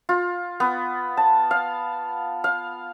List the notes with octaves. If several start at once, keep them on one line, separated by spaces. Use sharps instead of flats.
F4
B3
A5
F5
F5